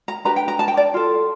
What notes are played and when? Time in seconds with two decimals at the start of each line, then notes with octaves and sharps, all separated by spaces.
0.08 A#5
0.25 D4 G4 B4 A#5
0.36 G5
0.48 A#5
0.59 A5
0.68 G5
0.77 D5
0.94 F4 A4